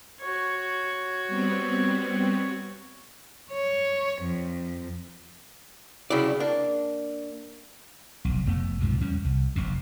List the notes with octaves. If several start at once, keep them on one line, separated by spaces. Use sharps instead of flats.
F#4 C#5
G3 B3 C4
C#5
F2
C2 C#3 F#3 E4 D5
A#3 D4
F1 B1
F1 F2 A3 B3
B1 G#2 C3 F3
E2 G3 C#4
C2
F1 A#1 F2 C3